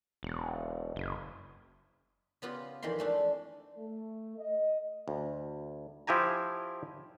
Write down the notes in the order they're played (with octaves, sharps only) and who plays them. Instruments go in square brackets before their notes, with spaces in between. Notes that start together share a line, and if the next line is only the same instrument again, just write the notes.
[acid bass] E1
F#1
[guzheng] C#3 B3 F4 G4
F2 D#3 E3 G4 C6
G#3 A3 D4
[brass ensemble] A3
D#5
[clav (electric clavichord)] D2
F3 E4 G4 G#5 A#5